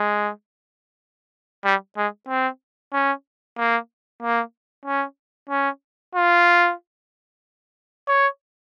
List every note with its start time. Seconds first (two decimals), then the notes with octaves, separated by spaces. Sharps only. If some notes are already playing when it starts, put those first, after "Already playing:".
Already playing: G#3
1.65 G3
1.97 G#3
2.28 C4
2.93 C#4
3.58 A#3
4.22 A#3
4.85 C#4
5.50 C#4
6.15 F4
8.08 C#5